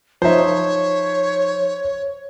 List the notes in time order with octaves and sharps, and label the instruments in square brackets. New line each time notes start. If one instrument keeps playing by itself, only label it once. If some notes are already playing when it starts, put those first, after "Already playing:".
[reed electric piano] F3 D#4 [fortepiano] C5 E5 [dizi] C#5